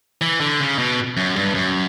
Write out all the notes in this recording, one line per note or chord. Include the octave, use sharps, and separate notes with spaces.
E3
D3
C#3
B2
F#2
G2
F#2